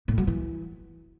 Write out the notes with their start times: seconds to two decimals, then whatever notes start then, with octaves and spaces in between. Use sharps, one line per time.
0.08 A2
0.18 F#3
0.27 E3